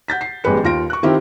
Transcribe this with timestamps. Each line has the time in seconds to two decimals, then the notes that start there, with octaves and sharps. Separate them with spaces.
0.08 F#5 G6 A6 B6
0.21 C7
0.44 A1 G3 G#3 B3 B4 C#7
0.64 D#2 F4 A#6 D7
0.90 C#6 F#6
1.03 D#3 C4 E4 F4 G4